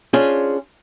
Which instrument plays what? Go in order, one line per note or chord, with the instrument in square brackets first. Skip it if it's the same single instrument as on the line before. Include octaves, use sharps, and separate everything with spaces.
[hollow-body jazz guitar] C#4 D4 F4 G#4 C5